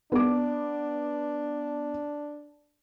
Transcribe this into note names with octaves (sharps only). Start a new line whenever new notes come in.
B3 D4 D6